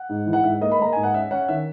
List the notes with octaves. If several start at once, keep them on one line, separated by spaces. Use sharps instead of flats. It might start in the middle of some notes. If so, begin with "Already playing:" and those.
Already playing: F#5
G#2
E3
F#5
G#2 E5
A#3 D#5
B5
A#3 A#5
G#2 G#5
F#5
C#4 E5
C#4 F#5
D#3 E5